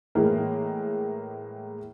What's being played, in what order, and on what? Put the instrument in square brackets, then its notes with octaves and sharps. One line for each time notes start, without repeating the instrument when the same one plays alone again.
[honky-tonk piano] A2 E3 G#3 A#3